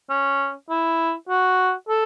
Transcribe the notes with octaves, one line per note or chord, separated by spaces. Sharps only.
C#4
E4
F#4
A4